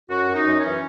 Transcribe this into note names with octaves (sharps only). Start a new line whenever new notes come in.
F#2 F#4
F#2
D#4
F#2
C#4
E3